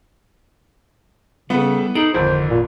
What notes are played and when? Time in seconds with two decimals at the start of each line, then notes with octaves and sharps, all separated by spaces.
1.50 C#3 G3 B3 E4 A4 B4
1.95 D#4 E4 G#4 A4 D7
2.14 G#1 F2 D3 E4 C5
2.50 A#2